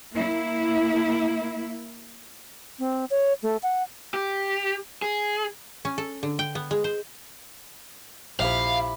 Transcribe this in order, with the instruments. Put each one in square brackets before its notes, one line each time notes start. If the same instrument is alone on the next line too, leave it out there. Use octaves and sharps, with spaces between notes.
[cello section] A#3 E4
[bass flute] C4
C#5
A3
F#5
[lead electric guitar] G4
G#4
[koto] C#4
A4
D3
G5
B3
G#3
C5
[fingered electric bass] A#1 [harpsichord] C3 F3 [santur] E4 B5 [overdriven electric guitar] F5